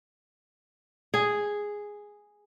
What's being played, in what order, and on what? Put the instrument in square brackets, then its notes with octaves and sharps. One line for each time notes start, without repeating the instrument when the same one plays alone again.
[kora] G#4